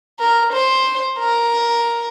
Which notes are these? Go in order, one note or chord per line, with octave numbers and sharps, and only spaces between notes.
A#4
C5
A#4